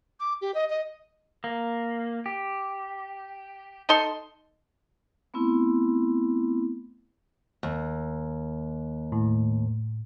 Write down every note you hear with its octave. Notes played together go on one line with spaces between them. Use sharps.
D6
G4
D#5
D#5
A#3
G4
D#4 A4 C6
A3 B3 C4 E4
D#2
A2